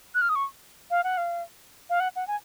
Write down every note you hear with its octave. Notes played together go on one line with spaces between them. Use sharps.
F#6
F6
D#6
C#6
F5
F#5
F5
F5
F#5
F#5
G#5